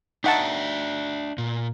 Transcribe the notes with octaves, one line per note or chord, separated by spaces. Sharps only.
D4 D#4 E5 F#5 G5 A5
A#2